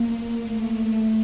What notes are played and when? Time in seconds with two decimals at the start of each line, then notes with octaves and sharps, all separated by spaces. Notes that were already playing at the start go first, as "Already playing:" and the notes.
Already playing: A#3
0.11 A#3
0.42 A3